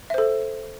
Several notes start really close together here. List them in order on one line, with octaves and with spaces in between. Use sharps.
E5 C5 A4